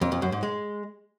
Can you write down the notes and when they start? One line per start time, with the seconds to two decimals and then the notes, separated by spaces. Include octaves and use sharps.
0.01 F2
0.12 F2
0.22 F#2
0.32 G#2
0.43 G#3